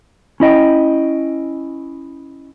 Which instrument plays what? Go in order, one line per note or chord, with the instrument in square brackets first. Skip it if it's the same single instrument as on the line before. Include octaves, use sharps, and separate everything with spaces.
[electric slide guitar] C#4 E4 D#5 G5